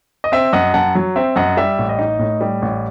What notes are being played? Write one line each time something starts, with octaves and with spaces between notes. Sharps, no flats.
D#5
C4 E5
F#2 D#5 F#5
F#2 F#5 A5
F#3
C4 E5
F#2 D#5 F#5
G3 E5
A1
D#5
D#4
A2
G3
A1